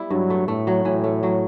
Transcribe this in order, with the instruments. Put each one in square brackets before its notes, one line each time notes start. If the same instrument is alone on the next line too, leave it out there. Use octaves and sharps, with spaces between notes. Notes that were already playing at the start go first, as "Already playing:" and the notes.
Already playing: [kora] G3 B3 E4
[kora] G2 [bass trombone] F#3
[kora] A3
[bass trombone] A2 [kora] A3
[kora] F#3
[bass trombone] A2 [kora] E3
[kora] A3
F#3